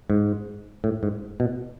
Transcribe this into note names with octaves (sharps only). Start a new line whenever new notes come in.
G#2
A2
G#2
B2